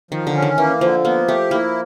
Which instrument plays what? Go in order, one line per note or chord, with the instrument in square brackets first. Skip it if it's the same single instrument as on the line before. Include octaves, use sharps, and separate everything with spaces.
[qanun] D#3 [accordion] F3
[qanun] D3
[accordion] C#4
[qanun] D#3
[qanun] E3 [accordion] A#3
[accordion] D3 [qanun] F3
[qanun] A#3 [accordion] B3
[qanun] A3 [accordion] G4
[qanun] A#3 [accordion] E4